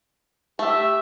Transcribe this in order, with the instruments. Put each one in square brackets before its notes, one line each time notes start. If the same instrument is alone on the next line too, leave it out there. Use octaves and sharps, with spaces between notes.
[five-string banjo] A3 [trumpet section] G4 E5